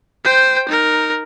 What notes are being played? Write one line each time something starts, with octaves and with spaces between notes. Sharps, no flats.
C5 G5
D#4 A#4